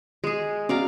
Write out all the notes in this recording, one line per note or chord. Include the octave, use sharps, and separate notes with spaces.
G#3 G#4
B3 C#4 F#4 D5 F5 A#5